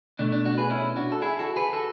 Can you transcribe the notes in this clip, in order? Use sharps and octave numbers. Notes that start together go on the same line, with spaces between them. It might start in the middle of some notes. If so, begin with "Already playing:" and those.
B2 A3 D4
D4
D4 F#4
G#4 B4
C#4 E4
D4 F#4
A4
E4 G#4
F#4 A4
G#4 B4
F#4 A4